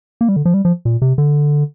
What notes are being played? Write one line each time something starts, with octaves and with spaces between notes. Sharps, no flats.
A#3
G3
D3
F3
G3
F3
A#2
C3
D3